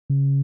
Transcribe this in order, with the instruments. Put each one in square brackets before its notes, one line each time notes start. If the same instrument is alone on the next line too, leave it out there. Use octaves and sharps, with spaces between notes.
[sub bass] C#3